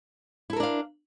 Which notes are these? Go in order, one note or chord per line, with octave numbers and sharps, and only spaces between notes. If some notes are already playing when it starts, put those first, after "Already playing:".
D4 E4 A4 A#4 F5